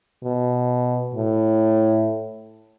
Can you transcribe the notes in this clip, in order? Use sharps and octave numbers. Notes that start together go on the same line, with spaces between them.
B2
A2